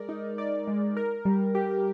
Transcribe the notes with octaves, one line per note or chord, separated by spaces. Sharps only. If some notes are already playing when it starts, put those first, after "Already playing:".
Already playing: G#3 A#4 D5
D#4
D5
G#3
A#4
G3
G4